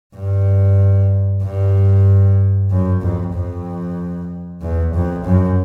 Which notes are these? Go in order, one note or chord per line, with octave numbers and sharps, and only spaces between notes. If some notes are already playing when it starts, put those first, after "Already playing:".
G2
G2
F#2
F2
F2
E2
F2
F#2